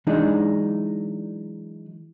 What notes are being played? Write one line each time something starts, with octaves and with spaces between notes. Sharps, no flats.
E3 F#3 G#3 D4 D#4